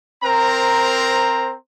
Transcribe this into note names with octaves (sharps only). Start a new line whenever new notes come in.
C4 A#4 C5 A#5